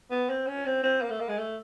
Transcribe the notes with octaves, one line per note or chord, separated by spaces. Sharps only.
B3
C4
C#4
C4
C4
A#3
A3
A#3
G#3
A3